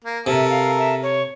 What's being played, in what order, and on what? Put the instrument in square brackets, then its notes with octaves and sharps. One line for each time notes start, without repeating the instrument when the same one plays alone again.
[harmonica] A#3
[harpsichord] C3 [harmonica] A4 A#4 [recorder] E5
[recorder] F5
E5
C#5